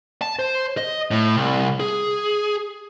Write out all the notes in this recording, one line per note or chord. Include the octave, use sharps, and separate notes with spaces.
A5
C5
D#5
A2
C2
G#4